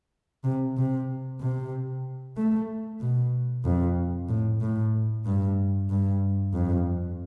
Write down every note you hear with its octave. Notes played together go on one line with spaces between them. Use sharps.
C3
C3
C3
A3
B2
F2
A2
A2
G2
G2
F2